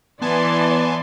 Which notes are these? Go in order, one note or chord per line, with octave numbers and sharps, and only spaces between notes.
E3 B3 D5 G#5 A5 C6